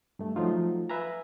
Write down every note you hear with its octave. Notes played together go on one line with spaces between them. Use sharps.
G2 A3
F3 F#3 A3 D#4 F4
B4 E5 F5 G#5 A#5